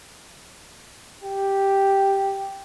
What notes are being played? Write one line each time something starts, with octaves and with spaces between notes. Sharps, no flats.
G4